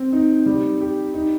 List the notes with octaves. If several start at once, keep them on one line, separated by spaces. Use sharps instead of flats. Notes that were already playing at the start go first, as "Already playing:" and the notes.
Already playing: C4
D#4
G3
G4
D#4